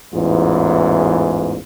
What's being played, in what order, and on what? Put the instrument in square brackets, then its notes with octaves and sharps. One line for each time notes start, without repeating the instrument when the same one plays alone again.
[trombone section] A1 E2 G#2 E3 F4